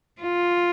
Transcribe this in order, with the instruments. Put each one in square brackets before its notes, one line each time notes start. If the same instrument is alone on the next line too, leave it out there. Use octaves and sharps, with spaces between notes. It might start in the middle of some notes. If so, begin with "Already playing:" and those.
[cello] F4